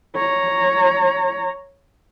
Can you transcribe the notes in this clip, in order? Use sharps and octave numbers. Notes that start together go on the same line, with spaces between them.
C#5 A#5